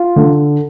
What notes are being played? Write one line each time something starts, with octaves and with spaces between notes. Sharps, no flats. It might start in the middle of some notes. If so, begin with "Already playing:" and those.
Already playing: F4
D3